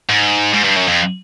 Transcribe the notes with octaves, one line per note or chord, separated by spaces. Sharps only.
G#2
G#2
G2
F#2
F2